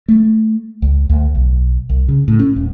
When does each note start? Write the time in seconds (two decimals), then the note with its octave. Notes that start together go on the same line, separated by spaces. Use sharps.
0.08 A3
0.82 C#2
1.09 D2
1.35 B1
1.89 C2
2.08 C#3
2.28 A2
2.39 C#4
2.56 D#1